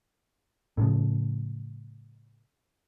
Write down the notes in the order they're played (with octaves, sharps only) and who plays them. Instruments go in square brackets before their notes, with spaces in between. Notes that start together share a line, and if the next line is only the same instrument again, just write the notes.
[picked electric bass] A2 C#3 F3